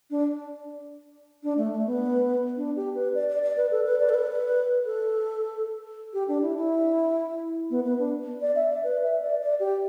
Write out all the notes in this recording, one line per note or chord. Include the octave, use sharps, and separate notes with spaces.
D4
D4
A3
A3
B3
D4
G4
B4
D5
D5
D5
B4
A4
B4
D5
A4
B4
A4
G4
D4
E4
E4
B3
B3
D4
D5
E5
D5
B4
E5
D5
D5
G4